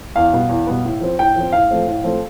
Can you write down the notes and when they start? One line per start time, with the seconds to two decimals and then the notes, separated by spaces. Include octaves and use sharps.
0.15 E2 F5
0.33 B2 G3 B3
0.49 E2
0.67 B2 G3 B3
0.85 A2
1.01 F3 C4
1.18 A2 G5
1.36 F3 C4
1.52 A2 F5
1.71 F3 A3 C4
1.87 A2
2.04 F3 A3 C4